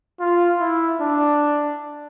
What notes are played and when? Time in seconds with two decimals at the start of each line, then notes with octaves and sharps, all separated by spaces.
0.20 F4
0.60 E4
1.00 D4